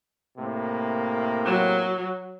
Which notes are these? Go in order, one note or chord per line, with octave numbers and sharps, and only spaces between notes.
A2 C3 A#3
F#3